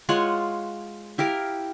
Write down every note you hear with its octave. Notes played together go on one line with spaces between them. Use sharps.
G#3 F4 C#5 F#5
E4 G4 A#4 F5